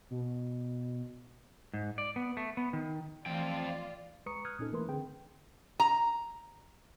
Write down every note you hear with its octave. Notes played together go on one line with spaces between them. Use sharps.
B2
G#2
D5
B3
A3
B3
D#3
F2 E3 A3 F4 D5 G5
G#3 B4 A#5 C#6 D#6 C#7
D#6 F6 F#6 G#6
A#2 C#4 D#4 A4
E3 A3 A#3 A#4 B4 C6
D3 C4 G#4 G5
A#5